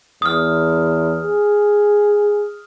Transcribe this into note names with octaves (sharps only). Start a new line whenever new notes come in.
E2 D#6 F6
G#4